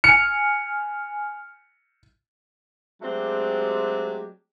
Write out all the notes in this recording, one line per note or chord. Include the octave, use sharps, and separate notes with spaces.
G#5 F6 C#7
F#3 G#3 A3 C4 D4 G4